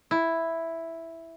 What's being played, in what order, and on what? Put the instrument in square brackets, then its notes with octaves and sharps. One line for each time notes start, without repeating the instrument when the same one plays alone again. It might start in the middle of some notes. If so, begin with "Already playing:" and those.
[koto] E4